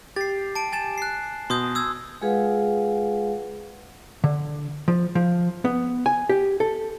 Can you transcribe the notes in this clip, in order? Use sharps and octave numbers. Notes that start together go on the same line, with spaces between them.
G4 A6 C7
A5 D7
G#5 A6 E7
F#6 C7
B2 C6 D#6 G6
D#6 E6 G#6
G#3 F4 G#4 B4 F5 F#5
D3
F3
F3
B3
G#5
G4
A4